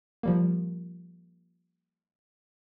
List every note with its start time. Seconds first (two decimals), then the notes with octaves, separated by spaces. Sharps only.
0.23 F3 G3 A#3